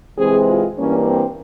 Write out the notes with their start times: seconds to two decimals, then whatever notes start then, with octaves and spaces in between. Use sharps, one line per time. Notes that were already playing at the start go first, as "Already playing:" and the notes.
0.17 C3 E3 G#3 C4 G#4
0.46 F4
0.75 G2 E3 A#3 C#4
1.04 C4